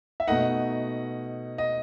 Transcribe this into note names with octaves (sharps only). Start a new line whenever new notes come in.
E5
B2 A3 D#4 D#5 F#5
D#5